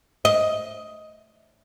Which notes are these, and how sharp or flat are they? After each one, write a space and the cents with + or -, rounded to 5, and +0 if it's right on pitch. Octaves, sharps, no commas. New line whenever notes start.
D#5 +10